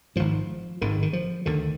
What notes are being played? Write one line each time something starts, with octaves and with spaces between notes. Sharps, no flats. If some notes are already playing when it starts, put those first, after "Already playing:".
G#1 G#2 F3
G#1 G#2 D#3
D#3
F3
D2 D3 D#3